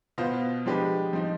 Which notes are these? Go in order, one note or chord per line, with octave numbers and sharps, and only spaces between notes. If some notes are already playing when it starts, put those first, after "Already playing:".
B2 B3 F4 C5
F3 G#3 D4 G4 B4
F3 C4 D#4